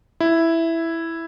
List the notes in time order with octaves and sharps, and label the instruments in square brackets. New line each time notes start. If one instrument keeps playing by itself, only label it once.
[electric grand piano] E4